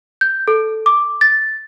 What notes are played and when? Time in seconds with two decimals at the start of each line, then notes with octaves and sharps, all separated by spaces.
0.21 G6
0.48 A4
0.86 D6
1.21 A6